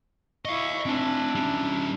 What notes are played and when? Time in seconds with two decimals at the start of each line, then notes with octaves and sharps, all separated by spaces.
0.45 E4 D#5 F5 C#6
0.86 C4 D4 E4 G#5
1.35 G3 C#4